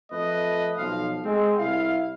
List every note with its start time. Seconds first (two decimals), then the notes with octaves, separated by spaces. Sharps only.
0.12 F2 A3 B4 D#5
0.78 B1 F3 F5
1.25 G#3 C4
1.59 C2 E4 F5